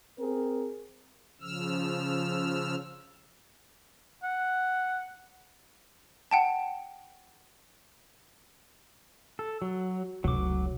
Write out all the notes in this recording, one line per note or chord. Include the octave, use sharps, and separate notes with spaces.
C4 G#4 A#4
C#3 F3 E6 F6
F#5
F#5 G5 A5
A4
F#3
F1 C#2 F#3 D6